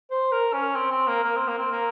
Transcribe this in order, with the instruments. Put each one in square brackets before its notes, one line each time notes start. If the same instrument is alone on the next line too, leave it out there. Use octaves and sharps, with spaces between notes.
[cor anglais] C5
A#4
C#4
C4
C4
A#3
A#3
C4
A#3
C4
A#3